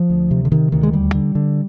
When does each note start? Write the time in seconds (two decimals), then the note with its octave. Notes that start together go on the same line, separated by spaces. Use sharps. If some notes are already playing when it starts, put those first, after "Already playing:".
Already playing: F3
0.10 D2
0.31 C3
0.45 D3
0.52 C3 D#3
0.72 D2 D#3
0.83 G#3
0.93 D#2 G3
1.15 D3
1.35 D3